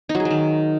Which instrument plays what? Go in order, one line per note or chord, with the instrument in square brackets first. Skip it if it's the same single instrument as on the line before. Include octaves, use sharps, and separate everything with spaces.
[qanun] D#4
F#3
G#4
F#3
D#3